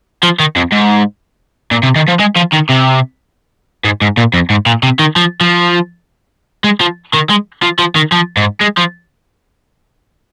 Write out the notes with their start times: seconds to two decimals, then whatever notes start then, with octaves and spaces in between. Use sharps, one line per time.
0.23 F3
0.40 D#3
0.56 F2
0.72 G#2
1.71 A#2
1.83 C3
1.96 D#3
2.08 F3
2.20 G#3
2.36 F3
2.53 D#3
2.70 C3
3.84 G#2
4.02 G#2
4.17 A#2
4.34 F2
4.50 G#2
4.66 A#2
4.83 C3
4.99 D#3
5.16 F3
5.41 F3
6.64 G#3
6.80 F3
7.13 D#3
7.30 G#3
7.63 F3
7.79 F3
7.95 D#3
8.12 F3
8.37 G#2
8.61 G#3
8.78 F3